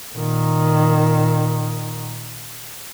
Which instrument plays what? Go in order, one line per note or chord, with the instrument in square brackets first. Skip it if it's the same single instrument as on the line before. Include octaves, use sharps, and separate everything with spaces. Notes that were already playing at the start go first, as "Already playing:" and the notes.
[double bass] A#2 D#3